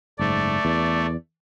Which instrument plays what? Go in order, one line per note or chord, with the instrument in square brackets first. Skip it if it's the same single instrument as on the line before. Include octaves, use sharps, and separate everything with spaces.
[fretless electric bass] F#1 G#2 [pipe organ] A3 [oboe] D5
[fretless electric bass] E2